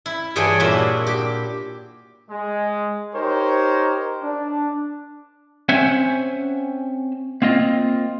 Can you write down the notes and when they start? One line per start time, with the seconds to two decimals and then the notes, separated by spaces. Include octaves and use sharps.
0.06 E4
0.36 G2 E3 D4 G#4 C#5 G5
0.60 A#2 D4 E4 F#4 E5
1.07 G4
2.30 G#3
3.15 D#4 G4 A#4 C5 C#5
4.21 D4
5.69 C4 C#4 C5 E5 F#5 G#5
7.42 A#3 C4 F4 D#5